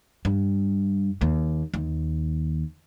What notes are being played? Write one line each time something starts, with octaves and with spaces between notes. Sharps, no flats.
G2
D#2
D#2